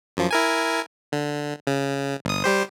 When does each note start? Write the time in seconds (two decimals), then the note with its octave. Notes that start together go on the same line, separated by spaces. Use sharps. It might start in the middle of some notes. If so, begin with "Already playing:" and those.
0.17 F#2 F3
0.31 E4 A#4 G#5
1.12 D3
1.67 C#3
2.25 G1 D#6
2.44 G3 G4 C5